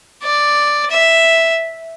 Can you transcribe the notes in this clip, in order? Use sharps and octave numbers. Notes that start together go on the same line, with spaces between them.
D5
E5